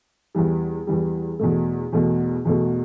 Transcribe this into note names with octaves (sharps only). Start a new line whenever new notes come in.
E2 E3 G3
E2 E3 G3
E2 B2 A3
E2 B2 A3
E2 B2 A3